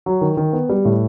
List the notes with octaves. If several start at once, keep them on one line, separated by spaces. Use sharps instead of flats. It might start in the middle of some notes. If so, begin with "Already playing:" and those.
F#3
D#3
D#3
B3
G3
A2